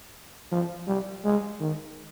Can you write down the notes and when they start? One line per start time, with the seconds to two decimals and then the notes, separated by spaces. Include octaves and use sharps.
0.52 F3
0.88 G3
1.25 G#3
1.60 D#3